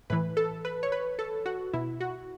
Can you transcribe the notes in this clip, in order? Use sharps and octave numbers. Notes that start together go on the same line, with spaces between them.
A2 E3 B4
A4
B4
C#5
B4
A4
F#4
B2 E4
F#4